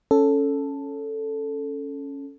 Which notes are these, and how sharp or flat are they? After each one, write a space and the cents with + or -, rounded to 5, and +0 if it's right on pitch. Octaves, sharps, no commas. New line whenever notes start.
C#4 +0 A4 +0